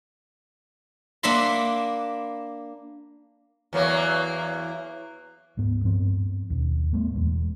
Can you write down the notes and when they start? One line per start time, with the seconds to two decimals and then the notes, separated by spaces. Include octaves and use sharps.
1.23 A#3 D4 E5 F#5 B5 C6
3.73 E2 F#3 A#3
5.57 D1 G#2 B3
5.85 G2 F3 B3 C4
6.50 D#2 B2
6.92 A2 G3 A3 B3
7.16 E1 E2 G#3